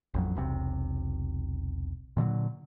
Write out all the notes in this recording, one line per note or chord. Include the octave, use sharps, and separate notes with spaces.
A1 F2 F#3
E1 B1 C3
A#2 D3 E3 F#3